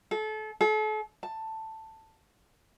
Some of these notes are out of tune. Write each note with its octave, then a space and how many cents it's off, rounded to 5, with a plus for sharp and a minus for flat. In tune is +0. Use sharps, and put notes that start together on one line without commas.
A4 -30
A4 -40
A5 +10